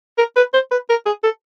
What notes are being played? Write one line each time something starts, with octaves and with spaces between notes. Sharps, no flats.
A#4
B4
C5
B4
A#4
G#4
A4